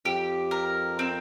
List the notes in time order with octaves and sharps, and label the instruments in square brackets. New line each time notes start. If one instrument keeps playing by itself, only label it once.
[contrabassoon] F2 [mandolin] G4
[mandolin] A#4
C4